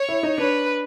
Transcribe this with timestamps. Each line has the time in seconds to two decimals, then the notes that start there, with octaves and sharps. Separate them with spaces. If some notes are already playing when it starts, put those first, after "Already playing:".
Already playing: C#5
0.09 E4
0.23 D#4
0.38 D4 B4